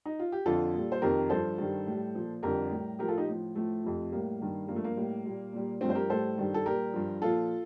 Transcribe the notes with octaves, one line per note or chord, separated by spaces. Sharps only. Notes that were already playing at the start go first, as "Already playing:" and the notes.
D#4
F4
G4
F2 D3 F3 F4 A4
A#2 G3
C5
F2 C3 D#3 G4 A#4
G2 F3 A4 C5
G2 D#3 G3
A2 G3
A#2 F3
F2 D3 G3 G4 A#4
A2 G3
A2 F3 G4 A#4
F4 A4
D#4 G4
A2 F3
A2 F3 A3
F2 C3 F3
A2 G3 A#3
G2 D#3 G3
G2 F3 A#3
A3
A#3
A2 G3
A#2 G3
A#2 G3
G2 F3 A3 C4
C5
G4 A#4
A2 G3 A4 C5
G2 D#3 G3
A4
A#2 G3 G4 A#4
G2 F3
A#2 F3 F4 A4